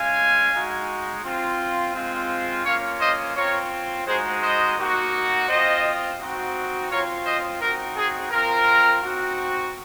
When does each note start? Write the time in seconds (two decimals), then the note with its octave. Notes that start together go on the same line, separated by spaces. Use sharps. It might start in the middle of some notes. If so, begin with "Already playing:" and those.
Already playing: G#3 C#4 F4 F5 G#5
0.51 G#3 D#4 F#4
1.23 C4 F4
1.93 G#3 C4 F4
2.64 A#3 C#4 F4 C#5 F5
3.00 C5 D#5
3.36 C4 F4 A#4 C#5
4.06 G#3 D#4 F#4 G#4 C5
4.42 C5 D#5
4.77 A#3 D#4 F#4
5.48 C4 F4 C5 D#5
6.19 C4 D#4 F#4
6.90 C4 F4 A#4 C#5
7.25 C5 D#5
7.61 C4 D#4 F#4 A#4
7.96 G#4
8.31 C4 F4 A#4
9.03 C4 D#4 F#4